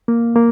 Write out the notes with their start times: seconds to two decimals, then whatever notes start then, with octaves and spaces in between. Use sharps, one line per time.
0.08 A#3
0.36 A#3